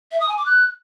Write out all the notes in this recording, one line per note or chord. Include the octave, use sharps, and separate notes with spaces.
E5
D#6
G#5
D6
F#6